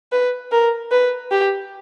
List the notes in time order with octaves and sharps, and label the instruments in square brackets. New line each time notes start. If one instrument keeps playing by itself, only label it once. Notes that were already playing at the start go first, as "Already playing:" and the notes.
[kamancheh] B4
A#4
B4
G4